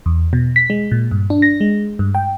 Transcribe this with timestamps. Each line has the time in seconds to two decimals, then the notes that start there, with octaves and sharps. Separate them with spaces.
0.06 E2
0.33 B2
0.56 B6
0.70 G#3
0.92 A#2
1.11 G2
1.30 D4
1.42 A#6
1.61 G#3
1.99 G2
2.15 G5